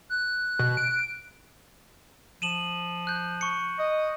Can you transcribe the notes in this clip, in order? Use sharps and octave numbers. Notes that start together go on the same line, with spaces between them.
F#6
B2
D7
F3 D#7 E7 F#7
F#6 G6
C#6 C#7
D#5